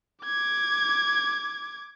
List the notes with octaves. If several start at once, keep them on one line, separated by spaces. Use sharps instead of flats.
D6 G#6